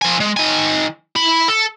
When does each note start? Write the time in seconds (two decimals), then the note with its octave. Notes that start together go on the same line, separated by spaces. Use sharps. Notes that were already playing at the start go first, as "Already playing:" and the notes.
0.02 F3 G#5
0.20 G#3
0.37 D#3 G#5
1.16 E4 B5
1.49 A4